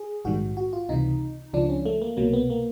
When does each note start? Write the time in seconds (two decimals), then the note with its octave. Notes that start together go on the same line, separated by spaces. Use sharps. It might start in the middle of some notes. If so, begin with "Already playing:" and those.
Already playing: G#4
0.25 A#1 G#2 D#3 G3 F#4
0.57 F#4
0.73 F4
0.89 C#2 C3 E3 G3 D#4
1.53 C#2 C#3 F3 D4
1.69 C#4
1.86 A3
2.02 A#3
2.17 C2 B2 F#3 A#3
2.33 B3
2.50 A#3